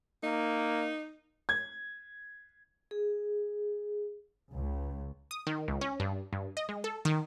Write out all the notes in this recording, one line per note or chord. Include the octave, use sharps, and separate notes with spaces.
A#3 D#4
G#6
G#4
C#2
D#6
D#3
C#2
C#4
G2
G2
D#5
G#3
A4
D#3